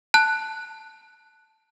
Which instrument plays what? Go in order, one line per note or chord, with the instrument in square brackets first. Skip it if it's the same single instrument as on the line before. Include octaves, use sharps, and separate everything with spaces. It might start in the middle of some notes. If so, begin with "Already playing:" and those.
[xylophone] A5 F#6